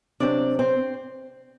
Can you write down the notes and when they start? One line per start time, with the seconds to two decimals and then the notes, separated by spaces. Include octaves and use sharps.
0.20 C3 F#3 C4 D4 D5
0.59 C4 C5